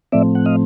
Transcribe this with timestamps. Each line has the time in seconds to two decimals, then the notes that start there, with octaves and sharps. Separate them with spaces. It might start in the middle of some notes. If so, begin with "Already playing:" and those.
0.12 A2 F3 A3 C4 D5 E5
0.35 F#5
0.46 D#5 F5